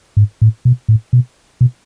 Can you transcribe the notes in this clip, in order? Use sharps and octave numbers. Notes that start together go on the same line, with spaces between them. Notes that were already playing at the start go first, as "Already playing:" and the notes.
G#2
A2
B2
A2
B2
B2